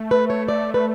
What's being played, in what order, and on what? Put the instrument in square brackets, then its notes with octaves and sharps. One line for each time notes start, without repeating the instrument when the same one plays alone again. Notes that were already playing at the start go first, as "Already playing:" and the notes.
Already playing: [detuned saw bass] A3
[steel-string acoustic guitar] B4
C#5
D5
B4